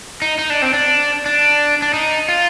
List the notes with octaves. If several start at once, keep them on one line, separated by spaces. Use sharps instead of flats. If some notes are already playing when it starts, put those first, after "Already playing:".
D#4
D#4
D4
C4
D4
D4
D4
D#4
F4